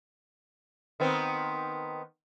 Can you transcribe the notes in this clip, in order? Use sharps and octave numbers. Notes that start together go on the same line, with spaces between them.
D#3 B3 C4